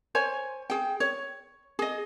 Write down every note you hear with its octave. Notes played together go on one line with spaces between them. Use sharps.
C5 C#5 G#5
G#4 G5
C#5
G#4 D#5